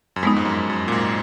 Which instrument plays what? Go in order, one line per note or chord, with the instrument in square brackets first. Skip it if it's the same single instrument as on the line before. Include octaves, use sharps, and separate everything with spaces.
[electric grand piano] F#2
[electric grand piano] F2 [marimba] G#3 B3 D#4
[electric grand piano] G#2
F#2
F#2
A#2
G#2